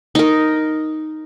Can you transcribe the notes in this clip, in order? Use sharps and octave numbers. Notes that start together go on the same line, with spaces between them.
D#4 A#4